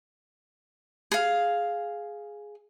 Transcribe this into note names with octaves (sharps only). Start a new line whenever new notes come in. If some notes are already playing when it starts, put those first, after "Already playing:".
G#4 F5